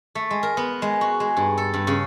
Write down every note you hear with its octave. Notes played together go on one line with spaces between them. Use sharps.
A3
G#3
A#4
B3
G#3
F#4
G#3
G2
A4
G2
C#3